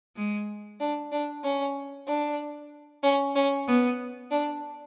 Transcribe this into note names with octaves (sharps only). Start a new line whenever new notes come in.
G#3
D4
D4
C#4
D4
C#4
C#4
B3
D4